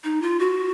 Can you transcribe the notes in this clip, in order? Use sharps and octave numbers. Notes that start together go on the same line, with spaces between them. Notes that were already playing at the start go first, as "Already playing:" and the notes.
D#4
F4
F#4